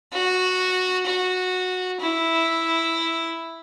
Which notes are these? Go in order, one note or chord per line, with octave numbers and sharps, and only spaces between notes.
F#4
F#4
E4